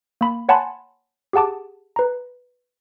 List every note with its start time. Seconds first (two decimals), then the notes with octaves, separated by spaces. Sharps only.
0.21 A#3 B5
0.49 C#5 F#5 G#5 A5 B5 C6
1.33 G4 G#4 F#5 A5 D6
1.96 B4 A#5